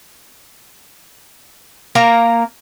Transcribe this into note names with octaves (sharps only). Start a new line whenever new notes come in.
A#3 A#4 A#5